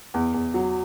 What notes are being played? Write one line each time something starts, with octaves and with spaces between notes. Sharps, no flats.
E2
E2
F#3